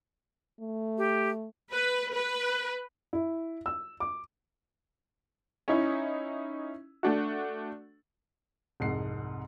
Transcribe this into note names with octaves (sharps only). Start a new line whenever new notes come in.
A3
G4
B4
B4
E4
E6
D6
C#4 D#4 E4
A3 D4 F#4
C2 F2 G#2 F#5 C7